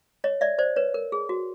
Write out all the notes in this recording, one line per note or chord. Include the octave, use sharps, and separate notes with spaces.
C#5 D#5
D5 E5
C5 D5
B4 C#5
A#4
G#4
F#4